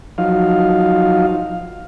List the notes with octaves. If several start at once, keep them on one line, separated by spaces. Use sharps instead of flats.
F3 F#3 D#4 F5